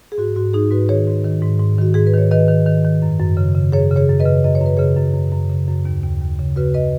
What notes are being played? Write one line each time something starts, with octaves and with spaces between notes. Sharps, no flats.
G#4
G#2 F#4
G#2 F#4
G#2 D#4 G#4
G#2 F#4 B4
D#3 G#4 C#5
G#2
D#3
G#2
G#2
D#3 F#4
G#2 G#4
B4
D#3 C#5
D#3 B4 D#5
D#3
D#3
D#3
F#2
F#2
C#3
C#3
F#2 G#4 C#5
C#3
G#4 C#5
F#2
B4 D#5
C#3
F#2 D#5
C#5
F#2 B4
C#3 G#4 C#5
F#2
F#2
F#2
C#3
F#2
D#2
D#2
D#2
C#3
C#3 F#4 B4
B4 D#5